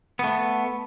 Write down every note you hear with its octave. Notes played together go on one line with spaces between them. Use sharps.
A3 B3